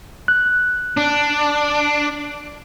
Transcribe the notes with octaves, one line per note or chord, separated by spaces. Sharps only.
F#6
D4